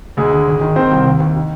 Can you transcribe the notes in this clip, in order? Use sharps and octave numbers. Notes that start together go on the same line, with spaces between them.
D2 G#3 G#4
D3
G#1
D#3
D#3 C4 C5
C2
D#2
D#2
D#3